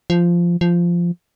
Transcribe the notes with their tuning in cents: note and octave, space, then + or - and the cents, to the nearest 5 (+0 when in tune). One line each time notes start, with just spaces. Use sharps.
F3 -10
F3 -10